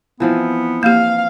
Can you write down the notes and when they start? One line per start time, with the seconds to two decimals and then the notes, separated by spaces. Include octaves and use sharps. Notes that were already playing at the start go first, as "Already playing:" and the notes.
0.20 E3 F3 B3 C4
0.83 A#3 G4 F5